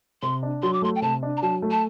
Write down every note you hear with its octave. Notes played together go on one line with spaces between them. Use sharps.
C3 C6
D4
F#3 C6
D6
A3 C6
G5
C3 A5
D4
A#5
F#3 A5
A3
A5